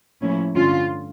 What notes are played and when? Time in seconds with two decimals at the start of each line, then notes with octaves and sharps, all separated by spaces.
0.20 A2 F3 A#3 C#4 E4
0.55 G2 D3 A3 C#4 F4